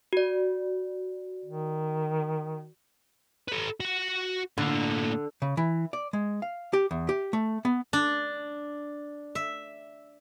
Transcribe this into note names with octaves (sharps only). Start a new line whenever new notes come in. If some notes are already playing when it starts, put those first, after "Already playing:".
F#4 D5
D#3
A4 B4
F#4 F#5
A2 D3 A#3
C#3
E3
D5
G#3
F5
G4
E2
G4
A3
B3
D4
E5